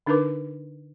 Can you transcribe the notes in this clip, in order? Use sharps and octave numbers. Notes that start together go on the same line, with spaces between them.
D3 D4 D#4 A#4 B4 D6